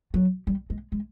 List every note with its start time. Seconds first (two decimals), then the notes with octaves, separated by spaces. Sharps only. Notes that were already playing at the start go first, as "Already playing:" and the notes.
0.14 F#3
0.47 G3
0.70 G#3
0.92 G#3